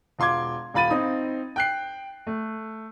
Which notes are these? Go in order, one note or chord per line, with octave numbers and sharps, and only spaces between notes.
E1 F4 C6 D6 G#6
D#1 F4 B5 A6 D#7
C4 D#4 D#6
G5 F#6 C7
A3